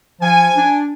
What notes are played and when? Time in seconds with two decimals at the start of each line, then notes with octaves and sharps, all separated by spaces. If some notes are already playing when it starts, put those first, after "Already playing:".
0.21 F3 G#5
0.56 D4